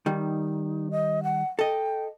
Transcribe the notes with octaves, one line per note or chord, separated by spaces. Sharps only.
D#3 G3 D#4
D#5
F#5
A4 D#5 G5